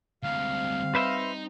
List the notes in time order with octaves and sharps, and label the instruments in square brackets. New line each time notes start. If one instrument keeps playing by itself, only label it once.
[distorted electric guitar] D2 G#3 [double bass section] G3 C4 [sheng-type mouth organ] F5
[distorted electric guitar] D#4 [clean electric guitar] B4 C5 E5